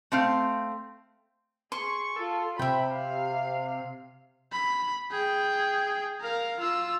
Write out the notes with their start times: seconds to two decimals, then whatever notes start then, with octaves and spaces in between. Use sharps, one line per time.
0.12 A3 C4 F5
1.72 G#4 C6 C#6
2.16 F4 A4
2.59 C3 E5 G5 B5
2.93 F5
4.52 B5
5.11 G#4 G5
6.21 A#4 F5
6.60 F4 E6